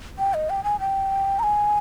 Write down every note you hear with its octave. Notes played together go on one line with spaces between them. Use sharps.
G5
D#5
G5
G#5
G5
A#5
G#5